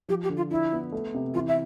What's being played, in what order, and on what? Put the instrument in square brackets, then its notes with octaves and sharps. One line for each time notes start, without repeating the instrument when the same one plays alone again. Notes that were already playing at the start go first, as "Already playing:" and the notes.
[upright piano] F3 [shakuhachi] G4
[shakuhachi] G4
[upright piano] D3
[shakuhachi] F4
[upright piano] D4 [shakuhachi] E4
[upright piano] B3
A3
C3
[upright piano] E3 [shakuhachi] F4
[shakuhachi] E5